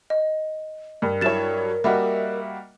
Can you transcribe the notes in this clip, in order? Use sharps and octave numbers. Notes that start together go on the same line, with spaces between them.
D#5
G2 A#4
F#3 E4 C#5 A6 E7
G3 A#3 F#4 D#5 E5